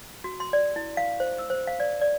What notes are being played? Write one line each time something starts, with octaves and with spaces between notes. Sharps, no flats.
F#4
C6
D5
E4
F5
C5
E6
C5
F5
D5
D5